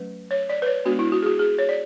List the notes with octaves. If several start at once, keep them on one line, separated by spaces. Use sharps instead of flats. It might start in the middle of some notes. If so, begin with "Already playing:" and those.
Already playing: F#3 A3 C#4 B4
C#5
D5
B4
C#5
G#3 B3 D4 F#4
E4
F#4
G#4
F#4
G#4
C#5
D5